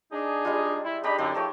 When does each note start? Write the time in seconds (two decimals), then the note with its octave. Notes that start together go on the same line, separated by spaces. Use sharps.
0.12 D4 D#4 G#4
0.45 G3 G#3 F4
0.84 E4
1.04 G#3 D4 D#4 G4 D5 B5
1.18 F#2 D3 D#4 D5 C6
1.35 F3 A3 G4 C#5 D#5 A5